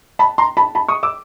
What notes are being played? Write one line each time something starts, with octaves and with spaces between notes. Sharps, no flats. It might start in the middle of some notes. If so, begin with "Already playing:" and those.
A5 B5
A#5 C6
A5 B5
A5 B5
C#6 D#6
D6 E6